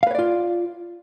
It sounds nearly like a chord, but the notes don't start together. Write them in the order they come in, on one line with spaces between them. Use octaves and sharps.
F5 B4 C#5 D5 F4